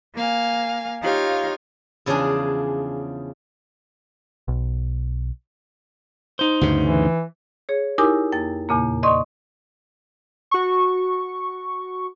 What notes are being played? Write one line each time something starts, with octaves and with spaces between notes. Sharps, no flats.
A#3 F5 G#5
D#4 F4 G4 C#5 F5
E2 C#3 F3 D4 G#4
B1
D#4 C5
D2 G2 C#3
E3
G#4 C#5
D#4 E4 G4 A#4 G#5 D6
F2 A#3 G5 A6
E2 A#2 C#3 A#3
D5 D#5 C6 C#6 D#6
F#4 C#6